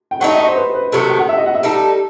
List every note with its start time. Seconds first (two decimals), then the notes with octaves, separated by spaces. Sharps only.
0.11 G5
0.20 F#3 A3 D#4 F#5
0.30 E5
0.38 D#5
0.47 C5
0.57 B4
0.74 B4
0.92 C3 D#3 F#3 A3 A4
1.10 G4
1.19 F#5
1.29 E5
1.38 D#5
1.46 F#5
1.55 E5
1.63 G3 D#4 A4